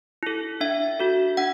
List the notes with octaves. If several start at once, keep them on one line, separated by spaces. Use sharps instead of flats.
E4 A4
D4 E5
F#4 A4
D4 F#5